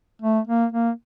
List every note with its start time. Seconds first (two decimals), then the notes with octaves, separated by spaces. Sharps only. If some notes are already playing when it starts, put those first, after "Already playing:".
0.22 A3
0.47 A#3
0.72 A#3